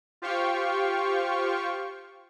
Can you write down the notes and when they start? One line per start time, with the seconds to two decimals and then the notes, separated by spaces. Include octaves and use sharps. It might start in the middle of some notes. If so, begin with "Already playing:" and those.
0.22 F4 G4 C5 F5 G5 C#6